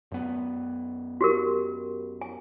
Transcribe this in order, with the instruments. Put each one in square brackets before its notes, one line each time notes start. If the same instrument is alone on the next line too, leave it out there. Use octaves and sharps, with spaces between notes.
[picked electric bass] F#2 B3
[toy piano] F#4 G4 A#4
G#5